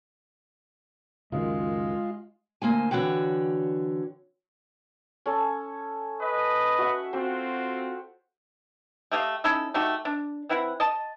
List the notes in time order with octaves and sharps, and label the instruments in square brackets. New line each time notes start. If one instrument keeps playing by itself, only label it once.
[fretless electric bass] C#2 F#2 D#3 [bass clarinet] G#3 [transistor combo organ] F4
[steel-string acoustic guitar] D2 A#3 C5 G#5
D3 E3 F#4 C#5 G5
[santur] C#4 A4
[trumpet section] B4 D#5
[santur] F#4 E5 F#5
[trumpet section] C4 F4 F#4 [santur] C5
[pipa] A3 G4 D#5 F5
C#4 D#4 E4 A4
A3 D#4 F#4 G4
D4
E3 C4 E4 F#5
D#5 A5